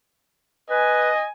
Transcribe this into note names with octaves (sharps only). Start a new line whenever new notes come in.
B4 D#5 G#5